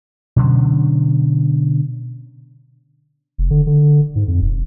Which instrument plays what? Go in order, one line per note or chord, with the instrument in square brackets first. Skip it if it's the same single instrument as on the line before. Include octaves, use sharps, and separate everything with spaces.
[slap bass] B2 D3 F#3 C#4
[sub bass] F1
D3
D3
G#2
F2
E1